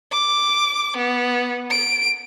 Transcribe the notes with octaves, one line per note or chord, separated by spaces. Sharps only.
D6
B3
D7